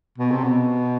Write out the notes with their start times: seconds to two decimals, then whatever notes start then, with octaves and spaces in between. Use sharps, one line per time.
0.18 B2
0.31 C3
0.44 B2